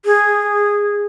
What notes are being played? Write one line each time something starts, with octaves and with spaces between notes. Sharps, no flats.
G#4